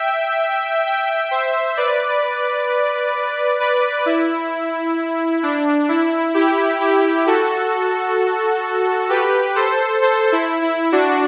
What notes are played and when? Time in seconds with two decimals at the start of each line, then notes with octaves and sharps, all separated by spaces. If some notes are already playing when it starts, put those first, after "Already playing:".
Already playing: E5 G5
0.85 E5 G5
1.31 C5 E5
1.77 B4 D5
3.60 B4 D5
4.06 E4
5.43 D4
5.89 E4
6.34 E4 G4
6.80 E4 G4
7.27 F#4 A4
9.09 G4 B4
9.55 A4 C5
10.02 A4 C5
10.32 E4
10.62 E4
10.92 D4 F#4